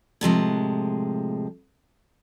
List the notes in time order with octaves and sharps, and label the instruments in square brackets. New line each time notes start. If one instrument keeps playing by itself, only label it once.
[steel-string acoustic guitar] A2 C3 F3 G#3